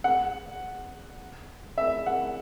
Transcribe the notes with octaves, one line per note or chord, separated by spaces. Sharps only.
F#5
E5
F#5